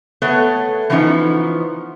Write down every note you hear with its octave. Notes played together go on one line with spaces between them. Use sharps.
A3 B3 B4 C#5
E3 F3 B3 C#4 D#4